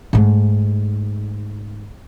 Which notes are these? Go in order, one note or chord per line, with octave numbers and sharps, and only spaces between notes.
G#2 A3